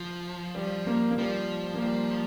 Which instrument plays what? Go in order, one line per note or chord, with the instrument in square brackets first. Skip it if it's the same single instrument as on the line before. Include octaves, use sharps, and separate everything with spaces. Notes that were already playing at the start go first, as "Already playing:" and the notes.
Already playing: [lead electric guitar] F3
[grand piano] G3
A#3
A#3
[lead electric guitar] F3 [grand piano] G3
[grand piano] A#3
G3